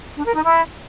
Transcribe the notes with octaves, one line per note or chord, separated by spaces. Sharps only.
D4
A#4
D#4
E4